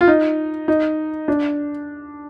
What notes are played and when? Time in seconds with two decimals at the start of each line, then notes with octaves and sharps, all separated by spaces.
0.01 F4
0.08 D#4
0.68 D#4
1.28 D4